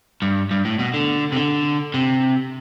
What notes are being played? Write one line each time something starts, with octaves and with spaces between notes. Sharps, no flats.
G2
G2
A2
B2
D3
C3
D3
C3